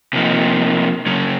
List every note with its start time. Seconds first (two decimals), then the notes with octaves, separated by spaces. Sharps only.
0.13 C3 F3 A#3 D#4
1.06 C#3 F#3 C#4